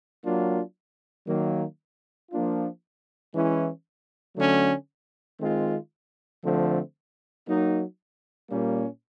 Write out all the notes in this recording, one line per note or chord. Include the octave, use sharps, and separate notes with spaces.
F#3 A#3 D4 F4
D#3 F#3 A#3
F3 A#3 D4 F4
E3 G#3 C#4 E4
D3 F#3 A3 C#4
D#3 G#3 C4 F4
D3 F3 A3 C4
F#3 A#3 D#4
A#2 G3 A#3 C#4